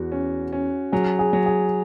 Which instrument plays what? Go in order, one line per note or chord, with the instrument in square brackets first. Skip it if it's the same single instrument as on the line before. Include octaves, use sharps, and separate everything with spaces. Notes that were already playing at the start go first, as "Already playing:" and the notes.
Already playing: [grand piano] E2 [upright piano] F#4
[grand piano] C#4
C#4
[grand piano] F#3 [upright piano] G#4
[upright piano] G#4
[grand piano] F#3
[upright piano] G#4